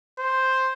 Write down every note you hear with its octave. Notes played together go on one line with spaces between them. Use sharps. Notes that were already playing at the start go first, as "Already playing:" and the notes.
C5